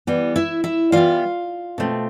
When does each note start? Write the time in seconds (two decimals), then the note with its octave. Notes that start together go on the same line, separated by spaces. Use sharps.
0.07 E3 G3 B3
0.36 E4 E5
0.64 E4 E5
0.92 E3 G3 B3 F4 F5
1.78 B2 A3 C4